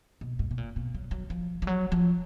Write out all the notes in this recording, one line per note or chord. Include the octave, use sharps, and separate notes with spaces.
B2
G#2
B2
A#2
B2
F#3
F#3
F3
F3
F#3
F3